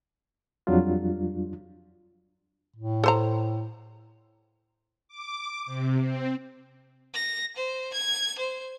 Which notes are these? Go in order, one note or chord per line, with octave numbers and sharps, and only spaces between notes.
F2 F#3 G3 D4 F4
A2
A4 C5 A#5
D6
C3
C4
A#6
C5
G#6
C5